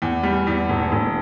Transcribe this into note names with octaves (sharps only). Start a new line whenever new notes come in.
E2
G3
E2
E1
E1